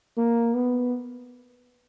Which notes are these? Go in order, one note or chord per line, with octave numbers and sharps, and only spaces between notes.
A#3
B3